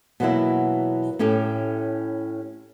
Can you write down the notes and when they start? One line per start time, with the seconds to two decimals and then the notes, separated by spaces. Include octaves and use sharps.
0.20 B2 E3 F#3 A#3 B3 E4
1.19 A2 C#4 E4 G4 A4